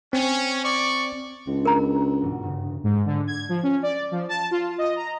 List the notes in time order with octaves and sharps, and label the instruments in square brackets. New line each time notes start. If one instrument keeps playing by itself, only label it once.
[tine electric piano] C4 [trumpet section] C#4
[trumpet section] D5 C#6
[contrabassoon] C#2 [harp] C4 D4
[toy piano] A#4 A#5
[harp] E1 G#2 B2
G2 C#3
[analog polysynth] G#2
D3
G#6
F3
C#4
D5
F3
A5
F4
D#5
A#5